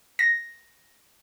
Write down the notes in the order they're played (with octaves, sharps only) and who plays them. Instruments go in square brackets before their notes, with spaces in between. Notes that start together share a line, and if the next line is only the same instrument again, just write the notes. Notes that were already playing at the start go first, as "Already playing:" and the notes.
[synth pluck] A#6